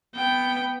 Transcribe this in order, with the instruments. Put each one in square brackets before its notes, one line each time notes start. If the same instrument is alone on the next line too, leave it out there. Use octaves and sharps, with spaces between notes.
[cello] B3 [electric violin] G5